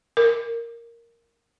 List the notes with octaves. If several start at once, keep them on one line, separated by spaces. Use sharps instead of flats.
A#4